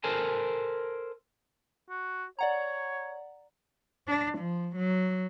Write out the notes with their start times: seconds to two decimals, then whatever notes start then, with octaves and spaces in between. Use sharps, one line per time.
0.04 A4 A#4 C5 G#5 A5
1.90 F#4
2.39 C#5 D5 F#5 A#5
4.08 D4
4.38 F3
4.76 F#3